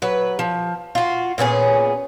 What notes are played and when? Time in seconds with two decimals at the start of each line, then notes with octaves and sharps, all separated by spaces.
0.02 F#3 B4
0.39 F3
0.95 F4 F#4
1.38 A#2 B3 C#4 G#4